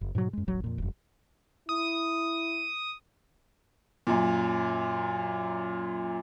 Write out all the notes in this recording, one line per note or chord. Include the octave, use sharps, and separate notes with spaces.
F#1
G#2 B2 D#3 F#3
F#2 G#3
D#1 A1 F#3
F2 A#2
E1 F#2
E4 D#6
F#2 A#2